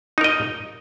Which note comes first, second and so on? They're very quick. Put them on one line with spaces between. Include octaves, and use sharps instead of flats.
D#4 A#4 D#5